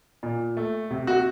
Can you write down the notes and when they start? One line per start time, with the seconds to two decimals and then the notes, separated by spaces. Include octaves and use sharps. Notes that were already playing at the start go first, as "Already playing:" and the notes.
0.23 A#2
0.57 A3
0.90 C3
1.07 F#4